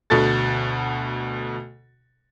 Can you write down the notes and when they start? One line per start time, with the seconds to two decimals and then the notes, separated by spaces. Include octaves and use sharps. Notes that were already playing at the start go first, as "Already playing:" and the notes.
0.10 D2 B2 F#4 A4 A6